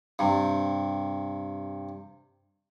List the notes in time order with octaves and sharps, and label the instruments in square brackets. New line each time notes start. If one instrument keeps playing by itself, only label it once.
[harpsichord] G2 C3